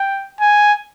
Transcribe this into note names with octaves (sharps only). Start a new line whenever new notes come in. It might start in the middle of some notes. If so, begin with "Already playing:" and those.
Already playing: G5
G#5